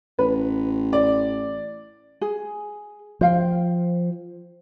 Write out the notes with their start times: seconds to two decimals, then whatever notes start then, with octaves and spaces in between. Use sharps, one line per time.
0.19 A1 B4
0.93 D5
2.21 G#4
3.21 F3 C5 F5 G5